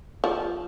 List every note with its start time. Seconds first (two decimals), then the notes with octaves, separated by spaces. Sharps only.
0.24 F3